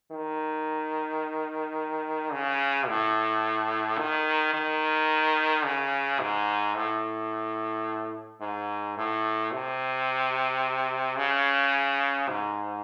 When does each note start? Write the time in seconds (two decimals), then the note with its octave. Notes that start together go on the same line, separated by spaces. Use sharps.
0.11 D#3
2.32 C#3
2.88 A2
3.99 D#3
4.54 D#3
5.65 C#3
6.20 G#2
6.76 A2
8.41 G#2
8.97 A2
9.52 C3
11.18 C#3
12.29 G#2